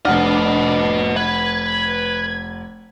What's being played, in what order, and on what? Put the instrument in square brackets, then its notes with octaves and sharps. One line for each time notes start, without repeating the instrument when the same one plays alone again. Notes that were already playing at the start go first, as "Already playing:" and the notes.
[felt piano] F1 F#5 F6 [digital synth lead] D4 [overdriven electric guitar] B4 D#5
[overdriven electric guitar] B4 [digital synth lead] G#6